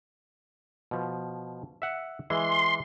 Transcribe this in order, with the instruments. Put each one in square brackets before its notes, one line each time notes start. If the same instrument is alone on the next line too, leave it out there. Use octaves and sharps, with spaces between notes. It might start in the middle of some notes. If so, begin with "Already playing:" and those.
[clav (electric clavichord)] B2 F3
E5 F#5
[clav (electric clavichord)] E3 G#3 [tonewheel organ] C6